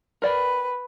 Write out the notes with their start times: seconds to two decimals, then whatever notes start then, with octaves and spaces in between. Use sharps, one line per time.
0.22 A#4 B4 D5 G5